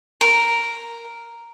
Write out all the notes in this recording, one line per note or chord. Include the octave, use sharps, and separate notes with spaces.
A#4